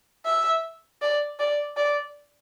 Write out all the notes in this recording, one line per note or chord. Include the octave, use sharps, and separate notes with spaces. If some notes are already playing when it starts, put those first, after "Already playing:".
E5
D5
D5
D5